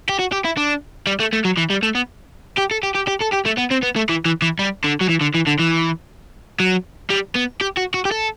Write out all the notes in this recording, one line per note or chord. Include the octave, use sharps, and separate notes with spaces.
G4
F#4
G4
E4
D4
G3
A3
A3
F#3
E3
G3
A3
B3
G4
A4
G4
G4
G4
A4
G4
A3
B3
C4
B3
A3
E3
E3
E3
G3
D3
F#3
E3
D3
E3
D3
E3
F#3
G3
B3
G4
F#4
F#4
G4
A4